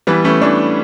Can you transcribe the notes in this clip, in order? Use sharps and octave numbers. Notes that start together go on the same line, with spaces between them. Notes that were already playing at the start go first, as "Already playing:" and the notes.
E3 G3 B3
E3 A3 C#4
E3 B3 D4